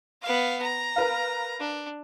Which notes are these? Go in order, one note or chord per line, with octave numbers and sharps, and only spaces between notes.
B3 F5
A#5
A#4 B4 F5
D4